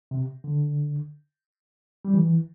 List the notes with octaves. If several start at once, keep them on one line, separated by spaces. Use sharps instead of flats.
C3
D3
G3
E3